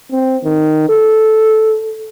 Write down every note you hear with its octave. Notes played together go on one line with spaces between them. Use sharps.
C4
D#3
A4